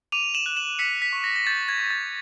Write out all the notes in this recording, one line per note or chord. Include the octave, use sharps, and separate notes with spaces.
D6 D#7 F7
E7 F#7
F#6
E7 F#7
E6 B6 C#7
B6
C#6
A#6
A#6
G6 A6
G#6
C#6
A6